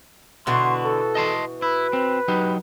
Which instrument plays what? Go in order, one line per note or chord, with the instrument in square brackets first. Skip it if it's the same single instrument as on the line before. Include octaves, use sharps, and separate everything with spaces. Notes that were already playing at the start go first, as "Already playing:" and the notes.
[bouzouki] B2 E3 F#4 [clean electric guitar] D3 [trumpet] C6
[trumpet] A4
[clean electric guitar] D#5 A5 C6
[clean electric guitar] E4 [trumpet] B4
[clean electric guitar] C4
F#3 D#4 G4